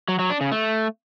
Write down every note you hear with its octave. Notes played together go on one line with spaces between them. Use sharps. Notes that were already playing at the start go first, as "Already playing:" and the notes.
F#3
F#3
D4
C#3
A3